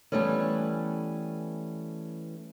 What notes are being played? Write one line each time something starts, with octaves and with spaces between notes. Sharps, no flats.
E3 F3 G3 A3 B3 C#4